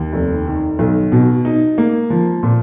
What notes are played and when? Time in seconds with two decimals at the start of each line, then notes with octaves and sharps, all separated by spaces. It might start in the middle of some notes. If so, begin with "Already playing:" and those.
Already playing: D#2
0.13 F1
0.46 D#3
0.79 B1
1.12 B2
1.45 D#4
1.78 A#3
2.10 F3
2.43 A#2